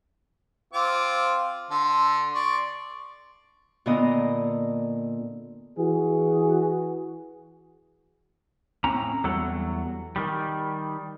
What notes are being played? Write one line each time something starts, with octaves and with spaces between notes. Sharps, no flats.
C4 F4 D6
D3 C6
D5 C6 C#6
A#2 D3 A#3 B3 D#5 A#5
E3 F#4 G#4
A2 C4 C#4 A#5
E2 F#3 G3 A4 F#5
D#3 G3